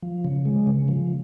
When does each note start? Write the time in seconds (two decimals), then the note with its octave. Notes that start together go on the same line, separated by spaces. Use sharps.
0.03 F3
0.25 C#3
0.45 G#3
0.67 C#3
0.88 F3